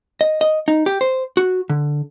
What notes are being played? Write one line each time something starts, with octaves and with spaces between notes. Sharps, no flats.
D#5
D#5
D#4
G4
C5
F#4
D3